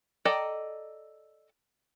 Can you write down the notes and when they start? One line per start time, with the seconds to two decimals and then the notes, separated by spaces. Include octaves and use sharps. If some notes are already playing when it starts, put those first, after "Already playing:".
0.25 A4 D5 D#5 G5 A#5